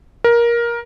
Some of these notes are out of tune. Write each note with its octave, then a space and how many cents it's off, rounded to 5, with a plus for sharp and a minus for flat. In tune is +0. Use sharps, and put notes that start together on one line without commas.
A#4 +15